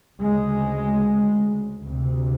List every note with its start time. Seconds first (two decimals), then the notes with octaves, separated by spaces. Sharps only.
0.19 D2 C#3 G#3
1.84 D2 C3